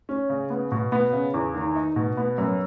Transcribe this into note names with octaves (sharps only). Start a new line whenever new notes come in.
C#4
C#3
B3
B2
B3
C#3
E2
D#3
D#4
B2
B3
F#2